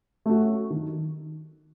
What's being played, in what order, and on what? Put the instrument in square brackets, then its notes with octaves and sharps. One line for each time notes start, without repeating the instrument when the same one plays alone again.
[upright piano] A3 C#4 F#4
D#3